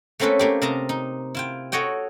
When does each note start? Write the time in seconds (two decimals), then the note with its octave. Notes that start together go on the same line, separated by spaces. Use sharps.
0.19 A3 A#3 C4 C#4 A4 B4
0.39 A3 A#3 G4
0.62 C3 A#4 D#5 A5 A#5
0.89 D#4
1.35 E4 F4 G5
1.72 F#4 A4 C#5 D#5 G5